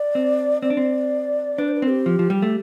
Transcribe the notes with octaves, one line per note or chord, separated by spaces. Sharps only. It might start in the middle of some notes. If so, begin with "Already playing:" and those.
Already playing: D5
C4
C4 D5
D4
C4
D4 B4
C5
B4
C4
G4
F3
F3
G3
A3